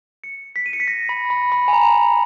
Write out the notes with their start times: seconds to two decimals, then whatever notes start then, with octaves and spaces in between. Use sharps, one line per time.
0.24 C#7
0.56 B6
0.66 D#7
0.73 C#7
0.80 B6
0.88 A#6
1.09 B5
1.30 B5
1.52 B5
1.68 G#5
1.73 A#5
1.95 B5